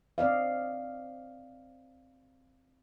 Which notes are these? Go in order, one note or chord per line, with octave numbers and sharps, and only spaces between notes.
C4 D5 D#5 F5